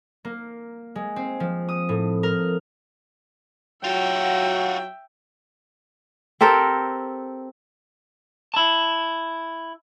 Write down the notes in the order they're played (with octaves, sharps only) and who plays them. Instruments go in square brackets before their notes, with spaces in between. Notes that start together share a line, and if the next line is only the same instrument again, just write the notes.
[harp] A#3
G#3
C4
F3
D#6
A2
A#4
[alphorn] F#3 [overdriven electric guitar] F4 F#4 [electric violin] E5 G5
[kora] C4 G4 A4 A#4
[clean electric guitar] E4 A5